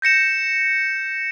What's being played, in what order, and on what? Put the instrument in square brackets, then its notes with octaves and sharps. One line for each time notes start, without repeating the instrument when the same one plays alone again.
[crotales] G6 A#6 C#7 E7